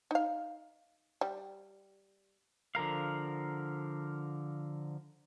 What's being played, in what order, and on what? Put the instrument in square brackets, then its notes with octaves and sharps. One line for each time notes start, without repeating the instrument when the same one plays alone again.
[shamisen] D#4 F5
G3
[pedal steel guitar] D3 F3 A#4 F5